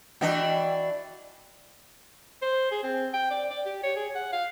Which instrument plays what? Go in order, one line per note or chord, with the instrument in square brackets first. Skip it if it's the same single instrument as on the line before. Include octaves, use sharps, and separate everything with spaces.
[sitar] E3 D4 F#4 [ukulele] D#5 G5
[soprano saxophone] C5
G#4
C4
G5
D5
D5
G4
C#5
G#4
F#5
F5